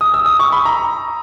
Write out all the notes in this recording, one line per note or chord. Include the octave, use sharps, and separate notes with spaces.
D#6
E6
D#6
C#6
B5
A#5